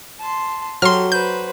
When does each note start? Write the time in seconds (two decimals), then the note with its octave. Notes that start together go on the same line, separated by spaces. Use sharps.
0.20 A5 C6
0.82 F#3 G4 A4 C6 F6
1.12 B4 C5 G6